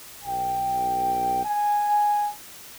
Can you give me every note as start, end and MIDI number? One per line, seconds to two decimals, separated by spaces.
0.24 1.43 35
0.24 1.43 79
1.44 2.30 80